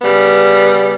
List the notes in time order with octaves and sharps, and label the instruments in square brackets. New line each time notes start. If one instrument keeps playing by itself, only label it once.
[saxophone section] C#3 G3 B3